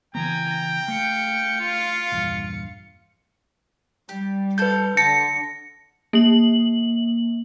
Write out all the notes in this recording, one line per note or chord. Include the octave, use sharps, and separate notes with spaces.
C#3 E3 B3 G5 G#5 A#5
A#5
A3 F5 C#7
F4
A#1 E2 G2
G3 G4
F4 A4 B4 G6
D3 A5 A#6 C#7
A#3 F#7